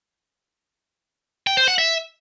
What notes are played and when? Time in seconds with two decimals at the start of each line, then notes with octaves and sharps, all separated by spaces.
1.47 G5
1.57 C5
1.68 F#5
1.78 E5